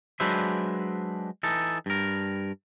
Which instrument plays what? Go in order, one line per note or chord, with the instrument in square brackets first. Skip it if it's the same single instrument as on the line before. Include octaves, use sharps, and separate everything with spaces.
[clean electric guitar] F#3 G#3 D4 B4 C5 E5
E3 D#4 A4
G2 A#4